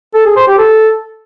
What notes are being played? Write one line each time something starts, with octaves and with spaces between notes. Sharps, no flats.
A4
G#4
C5
G4
A4